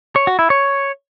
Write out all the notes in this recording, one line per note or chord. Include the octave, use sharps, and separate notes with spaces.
C#5
F#4
E4
C#5